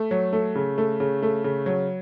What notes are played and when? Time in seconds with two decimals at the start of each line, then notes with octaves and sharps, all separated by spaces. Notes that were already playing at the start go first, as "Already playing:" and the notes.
Already playing: A3
0.11 F#3
0.33 A3
0.55 C#3
0.78 A3
1.00 C#3
1.22 A3
1.44 C#3
1.66 F#3